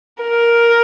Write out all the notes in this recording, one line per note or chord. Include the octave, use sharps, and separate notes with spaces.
A#4